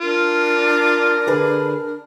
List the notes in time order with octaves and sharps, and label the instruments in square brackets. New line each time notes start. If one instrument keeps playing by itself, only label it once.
[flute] D4 [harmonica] F4 [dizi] A#4
[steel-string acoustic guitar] D3 G#4 B4